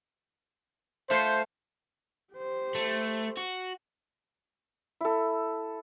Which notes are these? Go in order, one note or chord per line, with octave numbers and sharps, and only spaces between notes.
A3 F4 C5 F#5
G4 C5
A3
F#4
E4 A4